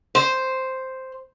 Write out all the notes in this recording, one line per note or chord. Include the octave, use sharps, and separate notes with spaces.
C5